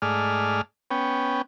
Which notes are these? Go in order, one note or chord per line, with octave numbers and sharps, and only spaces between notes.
G#2 A3 G#4 D5 F6
B3 C#4 G5